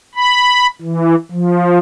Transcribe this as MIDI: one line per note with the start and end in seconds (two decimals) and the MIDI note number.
0.15 0.67 83
0.81 1.15 52
1.32 1.79 53